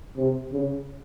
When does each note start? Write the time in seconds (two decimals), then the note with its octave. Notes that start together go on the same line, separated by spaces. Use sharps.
0.17 C3
0.53 C#3